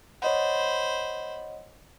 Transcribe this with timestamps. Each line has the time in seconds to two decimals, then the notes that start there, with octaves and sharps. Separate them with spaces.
0.22 C5 C#5 D#5 F#5 B5